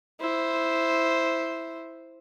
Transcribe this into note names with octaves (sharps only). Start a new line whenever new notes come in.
E4 C5